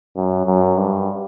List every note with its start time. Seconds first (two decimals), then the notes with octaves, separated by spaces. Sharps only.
0.16 F#2
0.46 F#2
0.78 G2